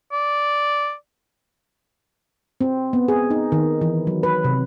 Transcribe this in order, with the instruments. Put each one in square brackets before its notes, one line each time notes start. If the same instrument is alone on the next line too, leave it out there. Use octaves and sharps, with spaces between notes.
[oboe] D5
[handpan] C4
B3
G#4
D#4
D#3
E3
F#3
B4
C3